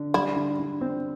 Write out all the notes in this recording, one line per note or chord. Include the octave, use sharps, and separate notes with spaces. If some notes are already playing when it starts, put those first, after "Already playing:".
Already playing: D3
G3 E4
D3
D3
C4